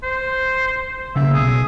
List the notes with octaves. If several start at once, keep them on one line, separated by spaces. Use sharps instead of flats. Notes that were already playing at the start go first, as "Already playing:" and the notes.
C5
C#3 A#3 E5
B1 G#4